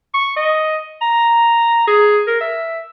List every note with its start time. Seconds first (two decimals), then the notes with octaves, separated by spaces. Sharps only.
0.14 C#6
0.37 D#5
1.02 A#5
1.87 G#4
2.27 A#4
2.41 E5